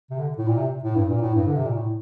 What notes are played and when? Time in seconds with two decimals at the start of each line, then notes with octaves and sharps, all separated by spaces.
0.10 C3
0.19 D3
0.38 A2
0.48 A#2
0.57 C3
0.84 A2
0.96 G2
1.09 A#2
1.21 A2
1.35 G2
1.47 D3
1.56 C3
1.65 A#2
1.74 A2